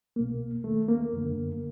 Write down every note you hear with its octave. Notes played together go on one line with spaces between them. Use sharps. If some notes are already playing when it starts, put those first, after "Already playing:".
C2 B2 A#3
D#2 D#3 A3
A#3
F#2 D3